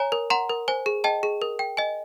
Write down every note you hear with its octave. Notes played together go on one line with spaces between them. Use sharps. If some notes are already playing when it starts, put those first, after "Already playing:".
Already playing: C#5 G#5 A#5
A#4
F#5 A#5 C6
A#4
C5 G#5
G#4
D#5 G5 A5
G#4
A#4
G5
D#5 G#5